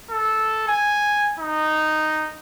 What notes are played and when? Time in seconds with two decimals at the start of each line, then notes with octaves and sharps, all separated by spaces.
0.11 A4
0.68 G#5
1.40 D#4